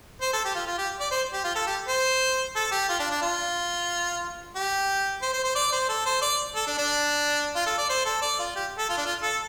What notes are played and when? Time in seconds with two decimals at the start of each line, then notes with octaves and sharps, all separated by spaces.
0.21 C5
0.33 A4
0.45 G4
0.55 F4
0.67 F4
0.78 G4
1.00 D5
1.11 C5
1.33 G4
1.44 F4
1.55 A4
1.67 G4
1.88 C5
2.56 A4
2.72 G4
2.89 F4
3.00 D4
3.11 D4
3.22 F4
4.56 G4
5.22 C5
5.33 C5
5.44 C5
5.55 D5
5.73 C5
5.89 A4
6.06 C5
6.22 D5
6.56 A4
6.67 D4
6.78 D4
7.56 F4
7.66 A4
7.78 D5
7.89 C5
8.06 A4
8.22 D5
8.39 F4
8.56 G4
8.78 A4
8.89 F4
8.97 D4
9.06 F4
9.22 A4